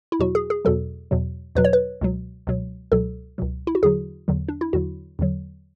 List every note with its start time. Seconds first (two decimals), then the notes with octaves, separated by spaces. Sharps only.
0.12 E4
0.19 E2 B2 F#3 F#4
0.35 G#4
0.50 G#4
0.65 E2 B2 F#3 A4
1.11 E2 B2 F#3
1.55 E2 B2 F#3 B4
1.65 C#5
1.73 B4
2.01 C#2 B2 F#3
2.47 C#2 B2 F#3
2.92 C#2 B2 F#3 A4
3.38 C#2 B2 F#3
3.67 E4
3.75 F#4
3.83 E2 D3 F#3 G#4
4.28 E2 D3 F#3
4.48 D4
4.61 E4
4.73 E2 D3 F#3 F#4
5.19 E2 D3 F#3